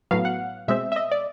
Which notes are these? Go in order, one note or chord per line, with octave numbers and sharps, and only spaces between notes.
A2 F#3 B3 F5
F#5
B2 G#3 C4 E5
E5
D#5
D5